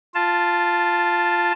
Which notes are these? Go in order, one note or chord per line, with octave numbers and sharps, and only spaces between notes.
F4 A5